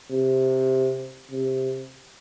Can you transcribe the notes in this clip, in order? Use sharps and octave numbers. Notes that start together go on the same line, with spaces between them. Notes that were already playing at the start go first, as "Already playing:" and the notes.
C3
C3